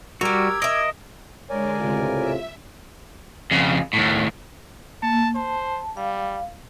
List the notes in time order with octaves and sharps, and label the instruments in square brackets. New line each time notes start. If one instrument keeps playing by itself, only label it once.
[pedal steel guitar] G3 F#4 [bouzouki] G4 A#4 [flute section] D6 E6 G#6
[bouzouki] A#4 E5 [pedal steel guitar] D#5
[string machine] D3 G#3 [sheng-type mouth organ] A#4 D5 G#5 [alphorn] C#5
[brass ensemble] C#2 A2 C3 [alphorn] F4
[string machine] E5
[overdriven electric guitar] F2 C#3
D#2 A2
[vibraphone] A#3 [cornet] A5
[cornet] C5 [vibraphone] A5
[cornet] G3 [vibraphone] F5